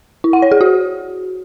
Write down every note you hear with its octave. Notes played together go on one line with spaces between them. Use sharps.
E4
F#5
C#5
G#4
F#4